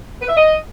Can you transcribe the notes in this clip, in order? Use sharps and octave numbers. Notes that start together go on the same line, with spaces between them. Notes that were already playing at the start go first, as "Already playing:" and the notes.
B4
E5
D#5